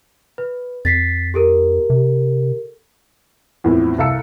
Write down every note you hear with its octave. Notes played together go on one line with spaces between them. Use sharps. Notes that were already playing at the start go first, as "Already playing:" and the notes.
B4
F2 A6 B6 C7
G4 A4 A#4
C3
E2 A2 F3 C4
C2 A4 F5 A5 E6 C#7